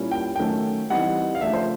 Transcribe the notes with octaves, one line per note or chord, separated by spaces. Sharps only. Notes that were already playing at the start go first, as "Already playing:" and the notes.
Already playing: A#2 G3 A#3 C#4 E4
G5
D#3 F#3 A3 C#4 G5
E3 G3 C4 D#4 F#5
F5
C#3 F3 A3 D4 E5
C5